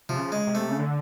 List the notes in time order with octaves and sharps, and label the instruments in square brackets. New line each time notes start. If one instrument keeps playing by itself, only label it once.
[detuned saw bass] C3 [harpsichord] F3
[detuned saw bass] C#3
[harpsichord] G#3
[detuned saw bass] C3
[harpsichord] A3
[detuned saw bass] C#3
D3